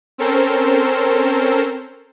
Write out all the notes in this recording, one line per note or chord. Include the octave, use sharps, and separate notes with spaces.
C4 C#4 A4 A#4 C5